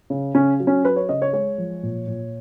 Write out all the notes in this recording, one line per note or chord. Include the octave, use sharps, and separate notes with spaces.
C#3
C#3 C#4
F#3
C#4
F#3 B4
C#5
C#3 D#5
C#5
G#3 C#5
F3
A#2
A#2